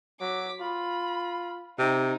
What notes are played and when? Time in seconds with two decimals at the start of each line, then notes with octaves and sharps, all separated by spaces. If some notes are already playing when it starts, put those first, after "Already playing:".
0.20 F#3 D6 B6
0.61 F4 B5
1.79 C3 D#4